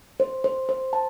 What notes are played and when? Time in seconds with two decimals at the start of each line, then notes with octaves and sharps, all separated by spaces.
0.20 C5
0.44 C5
0.69 C5
0.93 A5